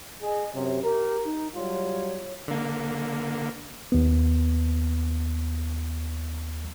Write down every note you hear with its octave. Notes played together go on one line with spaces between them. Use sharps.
G#4 D#5
F#2 C3 C#5
G4 A#4
D#4
F#3 G3 F4 C#5
D3 A#3
D#2 B3